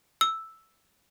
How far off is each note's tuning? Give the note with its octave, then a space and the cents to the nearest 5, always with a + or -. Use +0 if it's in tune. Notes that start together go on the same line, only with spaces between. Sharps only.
E6 +0